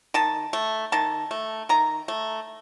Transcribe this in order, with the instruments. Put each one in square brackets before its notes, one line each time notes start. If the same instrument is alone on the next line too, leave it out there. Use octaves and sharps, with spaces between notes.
[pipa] D#3 A5
A3
D#3 A5
A3
D#3 A#5
A3